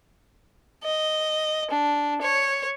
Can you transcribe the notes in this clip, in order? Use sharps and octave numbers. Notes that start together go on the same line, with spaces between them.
D#5
D4
C#5